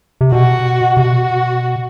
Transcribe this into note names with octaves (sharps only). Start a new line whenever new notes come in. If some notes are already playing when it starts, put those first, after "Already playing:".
C3
B2 F#4
C3
B2 F#4